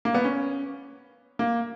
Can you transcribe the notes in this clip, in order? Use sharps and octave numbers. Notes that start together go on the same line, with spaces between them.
A#3
B3
C#4
A#3